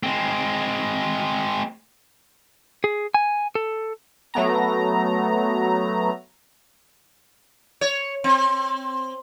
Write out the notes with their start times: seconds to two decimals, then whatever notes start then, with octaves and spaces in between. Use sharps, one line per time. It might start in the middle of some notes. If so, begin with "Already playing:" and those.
0.03 G#3 C4
2.84 G#4
3.14 G#5
3.55 A4
4.34 F#3 A3 B3 A#5
7.81 C#5
8.24 C4